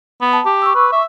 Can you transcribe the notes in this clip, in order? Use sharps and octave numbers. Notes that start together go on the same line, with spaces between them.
B3
A5
G4
C#6 D6 E6
B4
E5